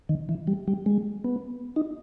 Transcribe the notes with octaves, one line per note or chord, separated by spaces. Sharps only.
D#3
E3
G3
G3
G#3
B3
D#4